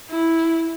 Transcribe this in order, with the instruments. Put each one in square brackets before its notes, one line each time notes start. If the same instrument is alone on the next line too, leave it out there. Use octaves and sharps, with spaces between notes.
[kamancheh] E4